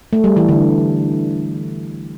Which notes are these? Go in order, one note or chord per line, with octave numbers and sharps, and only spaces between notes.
A3
G3
E3
D3